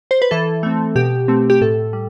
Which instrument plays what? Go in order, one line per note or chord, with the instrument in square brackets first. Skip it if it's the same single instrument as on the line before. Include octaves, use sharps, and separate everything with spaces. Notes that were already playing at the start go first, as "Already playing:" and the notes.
[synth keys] C5
B4
E3 A4
A3 C4
B2 G4
A3 C4
G4
A2 A4
G3